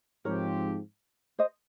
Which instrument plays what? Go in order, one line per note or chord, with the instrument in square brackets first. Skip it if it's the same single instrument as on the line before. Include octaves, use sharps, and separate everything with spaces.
[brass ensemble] G#2 F3 C4 G4 [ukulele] A#4 C#5
[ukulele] C5 D#5